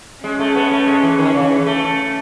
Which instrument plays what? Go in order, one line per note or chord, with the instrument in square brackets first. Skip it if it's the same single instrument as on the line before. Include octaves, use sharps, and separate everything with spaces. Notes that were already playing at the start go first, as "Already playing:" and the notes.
[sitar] G#3 [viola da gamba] C#4
[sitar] A3
B3
A3
G#3
E3
D#3
C#3
E3
A3